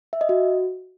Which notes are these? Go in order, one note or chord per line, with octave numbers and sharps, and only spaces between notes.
E5
D#5
F#4